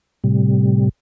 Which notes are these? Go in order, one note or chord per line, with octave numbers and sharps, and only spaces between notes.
A2 C3 G3